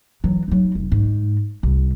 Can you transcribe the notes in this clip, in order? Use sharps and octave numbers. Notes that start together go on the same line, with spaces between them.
E3 F#3
F#3 D#4
F1
G#2
C2